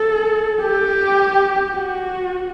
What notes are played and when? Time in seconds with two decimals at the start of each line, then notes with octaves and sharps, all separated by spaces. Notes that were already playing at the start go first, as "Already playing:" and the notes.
Already playing: A4
0.61 G4
1.72 F#4